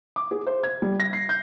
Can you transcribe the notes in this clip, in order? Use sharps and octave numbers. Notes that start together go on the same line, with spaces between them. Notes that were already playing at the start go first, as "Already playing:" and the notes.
D6
G#4
C5
G#6
G3
A#6
C7
G6